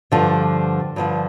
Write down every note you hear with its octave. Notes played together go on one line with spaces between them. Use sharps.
G2 D3 F3
G2 D3 F3